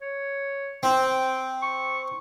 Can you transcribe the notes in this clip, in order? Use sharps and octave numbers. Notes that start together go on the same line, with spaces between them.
C#5
C4 G5
C#6